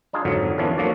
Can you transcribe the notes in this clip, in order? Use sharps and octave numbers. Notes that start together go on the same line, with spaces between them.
D4 D#4 F4 G#4
G#1 F2 G#2 D3 F#3
E2 D#3 F3 C#4 D4 E4
F3 F#3 A#3 F#4 A4 D5